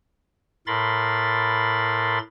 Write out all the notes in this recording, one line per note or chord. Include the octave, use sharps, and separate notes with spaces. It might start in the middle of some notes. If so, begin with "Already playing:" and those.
A2 A#4 B5 C6 A6